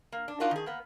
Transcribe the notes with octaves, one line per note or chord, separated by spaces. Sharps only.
A#3
D4
D4 D#4 F4 F#4 A#4
D#3 G#4
A#3 B3